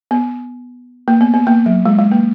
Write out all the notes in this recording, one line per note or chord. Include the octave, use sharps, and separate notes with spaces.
B3
A#3
B3
B3
A#3
F#3
G#3
G#3
A#3